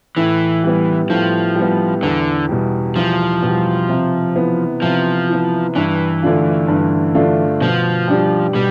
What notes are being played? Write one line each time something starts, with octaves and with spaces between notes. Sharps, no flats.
A2 E3
G3 B3
A2 F3
G3
B3
E2 D3
B2 G3
E2 F3
B2 G3
C3
E3 B3
C3 F3
E3 B3
G2 E3
D3 A3 D4 F4
G2
D3 A3 D4 F4
B2 F3
G3 D4 G4
B2 G3